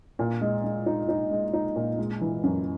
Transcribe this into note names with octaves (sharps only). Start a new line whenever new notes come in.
A#2
G#3
G#3
D#4
D#4
G#3
D#4
A#2
G#3
E3
F#2